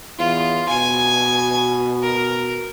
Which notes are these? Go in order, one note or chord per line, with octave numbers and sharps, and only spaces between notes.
E2 F4
B2 G#5
A#4